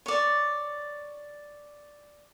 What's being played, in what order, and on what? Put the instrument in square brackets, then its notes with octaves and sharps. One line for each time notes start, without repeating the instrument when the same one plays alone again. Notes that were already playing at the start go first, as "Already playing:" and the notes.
[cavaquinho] C#5 D5